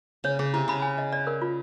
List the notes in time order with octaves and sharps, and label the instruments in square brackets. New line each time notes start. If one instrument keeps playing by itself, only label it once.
[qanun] C#3 [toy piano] C#5
[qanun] C#3 [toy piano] G#4
[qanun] C3 [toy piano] E4
[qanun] C#3 [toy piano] B5
[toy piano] G#5
D#5
D5
A#4
F4